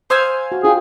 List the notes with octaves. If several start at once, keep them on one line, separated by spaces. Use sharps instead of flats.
C5 F5 G#5 C6 D#6 E6
F#4
D4 F4 G#4 G5